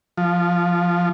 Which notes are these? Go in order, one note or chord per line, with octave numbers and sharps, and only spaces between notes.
F3